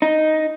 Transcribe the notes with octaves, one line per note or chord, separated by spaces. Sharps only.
D#4